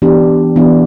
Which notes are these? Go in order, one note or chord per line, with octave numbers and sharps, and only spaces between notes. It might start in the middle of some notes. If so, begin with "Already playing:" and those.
E3 B3 D4 G4
E3 B3 D4 G4